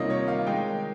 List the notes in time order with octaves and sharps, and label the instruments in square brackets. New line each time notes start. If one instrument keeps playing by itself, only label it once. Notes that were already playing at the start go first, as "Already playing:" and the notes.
Already playing: [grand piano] C3 D#3 G3 A#3 F4 C#5 D#5
C#5
F5
D#3 G#3 D#4 G5